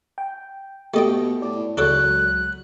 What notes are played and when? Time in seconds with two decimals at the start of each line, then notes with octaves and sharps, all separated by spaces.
0.18 G5
0.94 B2 A3 G4 D#5 G5
1.42 A2 D5
1.77 C#2 F#3 G#3 D4 A4 C#5 F#6